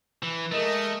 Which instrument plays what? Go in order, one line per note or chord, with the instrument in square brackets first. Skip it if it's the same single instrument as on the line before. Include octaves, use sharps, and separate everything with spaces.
[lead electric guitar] E3
[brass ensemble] G#3 A#4 D#5 [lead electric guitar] A3